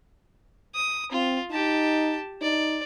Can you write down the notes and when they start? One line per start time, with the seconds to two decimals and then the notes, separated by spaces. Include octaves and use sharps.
0.75 D#6
1.12 C4 F4
1.51 D#4 G4 A5
2.42 D#4 D5